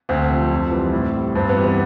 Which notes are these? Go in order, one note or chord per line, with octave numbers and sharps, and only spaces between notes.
D2 C4
C3 F3
F2
E3 G3
A2
G3
G2 C4
B3
E3 G3
B3